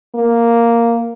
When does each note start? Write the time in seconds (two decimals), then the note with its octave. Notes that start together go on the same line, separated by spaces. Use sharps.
0.15 A#3